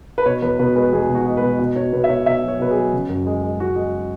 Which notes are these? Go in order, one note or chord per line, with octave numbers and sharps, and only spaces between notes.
B4
B2 C#5
E2 B4
B2 B4
G#3 B4
E2 G#4
B2
F#4
G#3
B4
B2
B2
B2 C#5
B2 B4
E5
B2 C#5
B2 E5
F#3
C#5
B2 B4
G#4
F#3
C#3
F#2
G#3
G#3
G#3 F#4
G#3